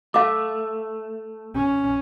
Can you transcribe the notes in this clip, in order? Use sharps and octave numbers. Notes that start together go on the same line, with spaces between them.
A3 F5 D6
C#4